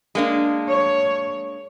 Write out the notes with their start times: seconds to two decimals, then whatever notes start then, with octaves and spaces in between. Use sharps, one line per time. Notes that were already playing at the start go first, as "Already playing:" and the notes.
0.15 G#3 A#3 D4
0.68 C#5